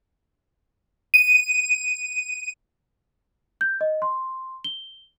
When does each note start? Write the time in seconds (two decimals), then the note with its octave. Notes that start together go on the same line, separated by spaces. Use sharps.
1.14 D#7
3.61 G6
3.81 D#5
4.02 C6
4.64 G7